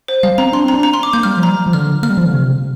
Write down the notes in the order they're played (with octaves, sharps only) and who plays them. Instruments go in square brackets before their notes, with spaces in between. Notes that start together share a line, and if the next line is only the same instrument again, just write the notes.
[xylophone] C5
[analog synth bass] G3 [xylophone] F5
[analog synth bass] C4 [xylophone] A#5
[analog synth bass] D4 [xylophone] C6
[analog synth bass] C4 [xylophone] A#5
[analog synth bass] D4
[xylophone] A#5
C6
D6
[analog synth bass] A#3 [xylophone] G6
[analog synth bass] G3 [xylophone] F6
[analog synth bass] F3
[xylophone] A#5
[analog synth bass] G3
F3
[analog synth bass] D3 [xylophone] F6
[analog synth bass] A#3 [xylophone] F6
[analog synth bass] G3
F3
D3
C3